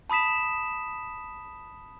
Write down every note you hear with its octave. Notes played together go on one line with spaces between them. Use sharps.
A5 B5 D#6 B6 E7